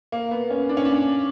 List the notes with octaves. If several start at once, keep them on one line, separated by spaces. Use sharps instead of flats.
A#3
B3
C#4
D4
C#4
D4